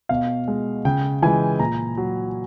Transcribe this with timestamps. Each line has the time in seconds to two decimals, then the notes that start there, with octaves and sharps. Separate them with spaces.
0.09 B2 F5
0.48 G#3
0.85 C#3 G5
1.22 E3 G#3 G#5
1.59 A#2 A#5
1.97 F#3